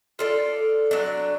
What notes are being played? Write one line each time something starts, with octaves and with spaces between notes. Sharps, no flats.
F4 A4 D5
F#3 D4